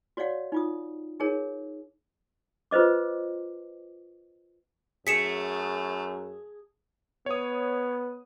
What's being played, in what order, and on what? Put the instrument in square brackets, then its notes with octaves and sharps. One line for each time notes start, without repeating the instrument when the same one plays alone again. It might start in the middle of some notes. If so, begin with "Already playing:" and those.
[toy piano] F#4 C#5 D5 F5 F#5
D#4 F4 D#6
D#4 G#4 A#4 C#5
F4 B4 C5 D#5 D6
[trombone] F#2 [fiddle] A3 [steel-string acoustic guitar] G#4 [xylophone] B6 C#7 E7
[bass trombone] B3 [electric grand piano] C#5 D#6